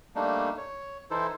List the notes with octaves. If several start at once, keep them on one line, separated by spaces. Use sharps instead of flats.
G3 A3 A#3 D4 D#4
C#5
E3 D#4 E4 A4 C5